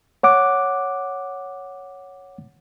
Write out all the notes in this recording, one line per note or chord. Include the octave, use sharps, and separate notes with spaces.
C#5 F#5 D6